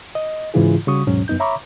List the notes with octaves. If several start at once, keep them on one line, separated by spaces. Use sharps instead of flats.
D#5
G#2 C#3 E3 E4 F4 G#4
C#3 G3 F#4 C#6 D#6
D#2 G#2 B2 F#3 C#4
F#2 B3 D#4 G6
C#5 E5 A#5 B5 C#6 D6